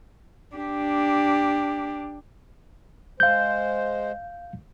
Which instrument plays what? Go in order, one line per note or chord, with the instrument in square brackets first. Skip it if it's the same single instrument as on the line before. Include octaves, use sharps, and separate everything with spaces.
[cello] D4 G4
[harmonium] G#3 C5 [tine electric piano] F5 G6